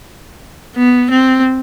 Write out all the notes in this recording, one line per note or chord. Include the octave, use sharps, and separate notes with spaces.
B3
C4